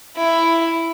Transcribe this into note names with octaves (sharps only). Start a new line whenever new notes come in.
E4